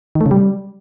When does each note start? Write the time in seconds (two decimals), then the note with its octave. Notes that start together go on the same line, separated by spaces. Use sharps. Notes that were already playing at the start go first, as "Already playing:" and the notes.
0.15 D#3
0.21 A3
0.26 C#3
0.31 G3